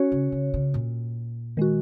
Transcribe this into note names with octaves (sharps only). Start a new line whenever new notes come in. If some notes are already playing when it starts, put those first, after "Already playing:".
Already playing: C#4 F#4 C#5
C#3
C#3
C#3
A#2
D#3 G#3 F#4